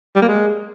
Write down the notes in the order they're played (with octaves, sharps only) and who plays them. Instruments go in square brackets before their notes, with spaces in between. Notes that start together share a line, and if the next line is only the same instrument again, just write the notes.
[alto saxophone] G3
A#3
G#3